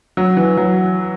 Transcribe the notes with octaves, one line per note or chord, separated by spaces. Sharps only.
F#3
E3
F#3